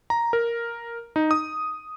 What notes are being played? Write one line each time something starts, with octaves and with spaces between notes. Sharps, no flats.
A#5
A#4
D#4
D#6